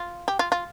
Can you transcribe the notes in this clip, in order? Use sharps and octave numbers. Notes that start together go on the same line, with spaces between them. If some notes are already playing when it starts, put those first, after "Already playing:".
Already playing: F4
G4
F4
F4